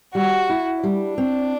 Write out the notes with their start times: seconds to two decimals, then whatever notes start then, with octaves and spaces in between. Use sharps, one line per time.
0.15 G3 F#4
0.49 E4
0.83 G3 D4
1.18 C4